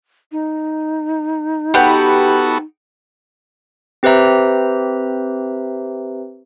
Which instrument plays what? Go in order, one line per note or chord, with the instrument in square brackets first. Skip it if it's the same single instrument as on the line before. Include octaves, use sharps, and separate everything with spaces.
[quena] D#4
[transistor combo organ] B3 F#4 A4 [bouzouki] G4 B4 F#5
[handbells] C4 G4 B4 C5 E5 A#5